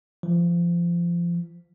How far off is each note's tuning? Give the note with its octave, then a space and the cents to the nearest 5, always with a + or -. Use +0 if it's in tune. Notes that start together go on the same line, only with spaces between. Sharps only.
F3 -25